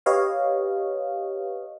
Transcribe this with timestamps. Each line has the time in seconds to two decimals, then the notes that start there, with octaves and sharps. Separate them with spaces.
0.06 G4 B4 C#5 D#5 F5